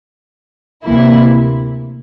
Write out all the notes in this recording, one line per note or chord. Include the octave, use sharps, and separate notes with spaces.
D2 C3 E3 A#3 E4